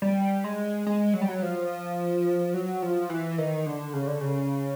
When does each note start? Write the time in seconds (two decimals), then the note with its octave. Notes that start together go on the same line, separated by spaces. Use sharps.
0.02 G3
0.44 G#3
0.86 G#3
1.14 F#3
1.21 G3
1.28 F#3
1.42 F3
2.54 F#3
2.82 F3
3.10 E3
3.38 D#3
3.66 D3
3.93 C#3
4.07 D3
4.21 C#3